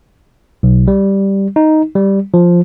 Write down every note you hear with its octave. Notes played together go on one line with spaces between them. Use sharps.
B1
G3
D#4
G3
F3